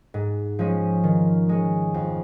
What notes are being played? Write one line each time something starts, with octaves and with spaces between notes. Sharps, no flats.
G#2
F3 G#3 C#4
D#3
G#3 C#4
F2